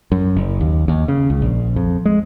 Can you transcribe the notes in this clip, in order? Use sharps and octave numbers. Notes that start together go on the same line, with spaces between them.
F#2
F#1
D#2
D#2
C#3
C#2
A#1
F2
G#3